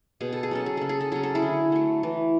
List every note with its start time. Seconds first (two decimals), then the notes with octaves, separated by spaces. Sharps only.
0.21 B2 G#4
0.33 A4
0.43 G#4
0.51 F#3 C#4 A4
0.66 G#4
0.77 C#3 A4
0.89 G#4
1.01 A4
1.12 F#3 C#4 G#4
1.23 A4
1.35 E4 G#4
1.42 D3
1.72 F#3 A3
2.03 E3